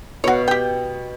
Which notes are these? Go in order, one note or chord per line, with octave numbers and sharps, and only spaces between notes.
B2 F#4 C#5 F5
G4 G5